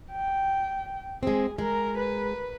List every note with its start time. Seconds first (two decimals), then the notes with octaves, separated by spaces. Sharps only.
0.11 G5
1.23 G#3 C4 G#4
1.58 G#3 A#4
1.97 B4